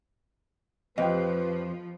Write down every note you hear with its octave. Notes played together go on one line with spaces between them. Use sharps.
F2 F3 G4 B4 D#5